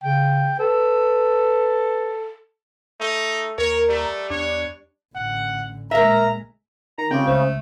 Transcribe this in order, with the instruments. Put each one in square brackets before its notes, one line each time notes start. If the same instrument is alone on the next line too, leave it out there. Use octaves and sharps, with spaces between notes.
[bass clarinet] C#3 [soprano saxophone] G5
[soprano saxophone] A4 [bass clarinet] B4
[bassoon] A3 [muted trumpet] D#4
[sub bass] D#2 [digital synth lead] A#4 [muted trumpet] C#5
[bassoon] G3 [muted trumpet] A3
[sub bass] E2 [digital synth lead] D4 [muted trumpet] C#5
[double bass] A1 D3 [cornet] F#5
[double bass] A#1 G#3 [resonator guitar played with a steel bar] A#4 E5 [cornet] A#5
[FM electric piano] D#3 [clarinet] A#5
[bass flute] C#3 [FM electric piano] G#3 F4 G4 [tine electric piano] C4 [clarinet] G5
[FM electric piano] C#2 [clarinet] A3 [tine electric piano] C5